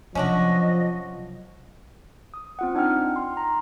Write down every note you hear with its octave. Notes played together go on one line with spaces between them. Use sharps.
C3 F3 F#3 C#4 D4 F#4 D#5
D#6
C4 F4 F#5
D4 D#4 F#5 G5 F6
C6
A#5